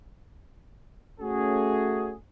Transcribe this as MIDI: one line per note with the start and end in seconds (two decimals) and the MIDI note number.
1.21 2.14 57
1.21 2.14 61
1.21 2.14 66
1.21 2.14 68